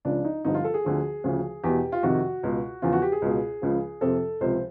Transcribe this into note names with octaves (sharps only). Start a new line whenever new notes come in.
C#2 C#3 F3 D4
D#4
G2 D3 F3 D#4
F4
A4
G#4
D2 D3 F3
D2 C#3 F3
E2 B2 G4
F4
F2 C3 D#3 F#4
C#2 B2
E2 C#3 F3 F4
F#4
G4
G#4
C#2 B2
C#2 C#3 F3
F2 C3 F3 A4
C#2 C3 F3 C5